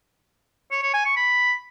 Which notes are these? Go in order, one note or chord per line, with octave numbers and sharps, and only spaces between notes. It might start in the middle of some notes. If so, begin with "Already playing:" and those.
C#5
C#5
G#5
C#6
B5